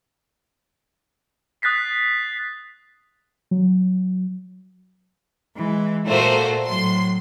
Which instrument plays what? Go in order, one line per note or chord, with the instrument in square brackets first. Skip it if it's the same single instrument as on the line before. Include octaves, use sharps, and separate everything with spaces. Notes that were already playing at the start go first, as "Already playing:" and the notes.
[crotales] D#6 F#6 A6 B6 C7
[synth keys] F#3
[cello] E3 G#3
[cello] A#2 F#4 [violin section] A3 A#3 C5
[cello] A2 F#3 [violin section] C6